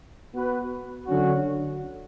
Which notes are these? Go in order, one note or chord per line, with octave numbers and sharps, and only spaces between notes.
B3 F#4 B4
D3 F#3 C#4 F#4